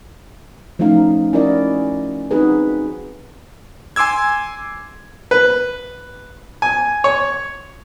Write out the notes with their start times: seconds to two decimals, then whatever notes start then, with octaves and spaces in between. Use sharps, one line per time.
0.79 F3 A3 C#4 D#4 F5
1.33 C#4 E4 F#4 A#4 D5 D#5
2.31 C4 D#4 F#4 G#4 B4
3.96 G#5 C6 D6 E6 G#6
5.31 B4
6.62 G#5
7.04 C#5